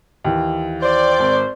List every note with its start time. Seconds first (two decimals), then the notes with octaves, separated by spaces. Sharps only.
0.24 D#2 E3
0.82 C5 D5
1.19 G#1